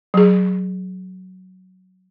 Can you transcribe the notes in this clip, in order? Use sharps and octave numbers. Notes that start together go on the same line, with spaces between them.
F#3 G#4